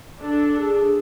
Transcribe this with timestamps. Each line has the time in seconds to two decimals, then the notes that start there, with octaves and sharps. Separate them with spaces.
0.20 D4 A4
0.57 G#4